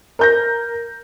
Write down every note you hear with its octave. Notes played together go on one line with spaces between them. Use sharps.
A#4 G6 A#6